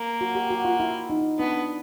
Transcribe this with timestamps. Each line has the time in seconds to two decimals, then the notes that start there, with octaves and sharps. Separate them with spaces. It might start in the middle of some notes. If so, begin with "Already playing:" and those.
Already playing: A#3
0.21 F#4
0.35 G4
0.50 F#4
0.65 F4
0.80 E4
1.10 D#4
1.39 B3 D4